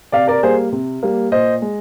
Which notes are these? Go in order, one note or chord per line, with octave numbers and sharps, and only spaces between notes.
C3 D5 F5
A#4 D5
G3 A#3 G#4 C5
C3
G3 A#3
A#2 C5 D#5
G#3